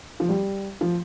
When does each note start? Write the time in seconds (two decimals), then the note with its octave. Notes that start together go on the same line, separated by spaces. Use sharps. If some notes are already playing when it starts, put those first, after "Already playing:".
0.20 F3
0.29 G3
0.81 F3